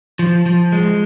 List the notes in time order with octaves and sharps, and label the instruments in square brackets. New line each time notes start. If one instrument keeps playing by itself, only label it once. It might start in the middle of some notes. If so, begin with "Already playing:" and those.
[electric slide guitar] F3
F3
G#3